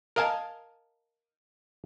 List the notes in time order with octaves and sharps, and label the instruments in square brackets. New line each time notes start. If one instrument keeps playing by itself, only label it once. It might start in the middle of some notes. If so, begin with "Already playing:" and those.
[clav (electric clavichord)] A#4 D#5 F5 G#5 A5